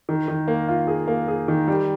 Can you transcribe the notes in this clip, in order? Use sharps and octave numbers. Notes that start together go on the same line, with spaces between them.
D#3
D#3
A#3
F4
G#4
A#3
G#4
D#3
G3